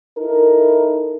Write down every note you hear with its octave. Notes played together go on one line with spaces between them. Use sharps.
D#4 E4 A4 A#4